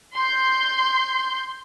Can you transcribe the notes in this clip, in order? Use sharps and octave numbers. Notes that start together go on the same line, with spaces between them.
C6 G6